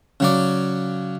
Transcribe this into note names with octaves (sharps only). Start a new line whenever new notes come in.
C#3 F#3 D5